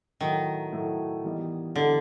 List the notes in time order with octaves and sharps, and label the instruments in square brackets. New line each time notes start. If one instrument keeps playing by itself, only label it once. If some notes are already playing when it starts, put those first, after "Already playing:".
[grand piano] A2 F#3 A3 [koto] D#3
[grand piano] A2 F#3 A3
E3 G3 B3 D#4
[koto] D3 [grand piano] E3 G3 B3 D#4